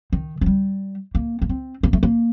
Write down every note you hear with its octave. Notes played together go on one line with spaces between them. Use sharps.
D#3
F3
G3
A#3
A#3
C4
A#3
A3
A#3